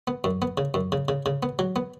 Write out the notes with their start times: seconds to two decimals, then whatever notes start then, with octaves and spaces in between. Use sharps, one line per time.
0.07 B3
0.24 F#2
0.42 B3
0.58 C#3
0.74 F#2
0.92 C#3
1.08 C#3
1.26 C#3
1.43 B3
1.59 F#3
1.76 B3